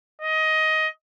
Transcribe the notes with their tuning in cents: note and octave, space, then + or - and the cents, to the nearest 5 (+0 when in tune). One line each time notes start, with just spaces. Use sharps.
D#5 +15